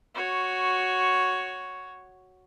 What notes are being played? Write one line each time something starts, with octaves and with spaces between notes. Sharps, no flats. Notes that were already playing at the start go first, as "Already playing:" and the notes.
F#4 C#5